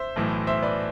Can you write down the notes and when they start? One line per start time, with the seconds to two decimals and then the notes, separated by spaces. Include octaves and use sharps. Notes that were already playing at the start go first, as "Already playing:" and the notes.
Already playing: C5 E5
0.16 B1 A2 E3
0.47 C5 E5
0.63 B4 D5